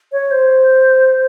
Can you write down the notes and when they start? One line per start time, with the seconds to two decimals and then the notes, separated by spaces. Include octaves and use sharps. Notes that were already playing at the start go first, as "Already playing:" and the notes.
0.12 C#5
0.31 C5